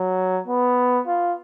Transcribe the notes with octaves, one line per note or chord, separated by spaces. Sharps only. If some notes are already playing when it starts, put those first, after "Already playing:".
Already playing: F#3
B3
F4